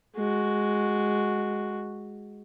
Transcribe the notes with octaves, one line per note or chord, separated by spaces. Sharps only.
G#3 F#4